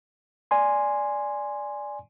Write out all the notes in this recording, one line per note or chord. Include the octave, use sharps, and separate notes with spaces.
D5 G#5 C6